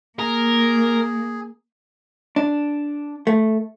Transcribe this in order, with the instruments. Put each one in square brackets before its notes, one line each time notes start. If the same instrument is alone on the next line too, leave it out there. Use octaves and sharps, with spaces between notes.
[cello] A#3 [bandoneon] G#4 [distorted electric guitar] A#4
[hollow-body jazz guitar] D4
A3